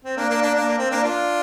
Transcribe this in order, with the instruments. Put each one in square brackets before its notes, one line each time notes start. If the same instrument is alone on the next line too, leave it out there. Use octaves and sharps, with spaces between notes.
[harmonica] C4
A#3 D4
A#3 D4
A#3 D4
A#3 D4
A#3
C4
A#3 D4
D4 F4